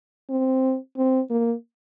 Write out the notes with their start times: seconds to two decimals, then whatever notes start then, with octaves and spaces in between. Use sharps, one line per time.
0.30 C4
0.97 C4
1.30 A#3